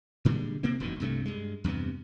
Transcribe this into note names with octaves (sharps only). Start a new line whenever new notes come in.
A#2 D3 G3 G#3
C3 A#3 C4
E1 F#2 A#2 D#3
C2 G2 C3 A3
G2 G#3
E2 G2 C3 B3